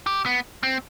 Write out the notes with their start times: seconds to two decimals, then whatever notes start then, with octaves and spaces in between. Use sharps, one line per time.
0.06 G4
0.26 B3
0.63 C4